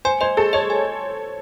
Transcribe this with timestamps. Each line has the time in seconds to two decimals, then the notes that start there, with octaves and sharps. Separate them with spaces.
0.05 C5 G#5
0.21 C5 D#5
0.37 G#4 A4
0.53 C#5 D#5
0.70 G#5